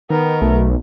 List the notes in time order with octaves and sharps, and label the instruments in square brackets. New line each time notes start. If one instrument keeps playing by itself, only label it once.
[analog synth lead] D#3 [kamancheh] B3 A#4
[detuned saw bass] B1 [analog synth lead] A3